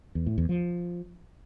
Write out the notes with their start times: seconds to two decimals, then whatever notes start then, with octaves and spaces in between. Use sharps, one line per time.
0.15 E2
0.26 A2
0.38 E2
0.49 F3